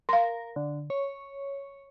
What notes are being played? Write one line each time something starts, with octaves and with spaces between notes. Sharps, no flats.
A#4 F5 C6
D3
C#5